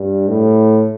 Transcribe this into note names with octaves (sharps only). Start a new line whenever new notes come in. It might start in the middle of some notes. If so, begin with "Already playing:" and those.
Already playing: G2
A2